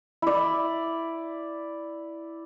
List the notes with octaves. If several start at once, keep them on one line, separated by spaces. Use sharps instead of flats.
E4 D5